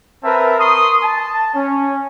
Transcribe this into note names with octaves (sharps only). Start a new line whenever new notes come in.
C4 A#4 B4 E5 A5
A#4 C6 C#6 D#6
A5
C#4